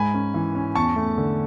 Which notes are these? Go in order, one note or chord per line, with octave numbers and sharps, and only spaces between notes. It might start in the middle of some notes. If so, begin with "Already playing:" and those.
Already playing: G#2 G#5 B5
C#4
E3
C#4
E2 A5 C#6
A3
D3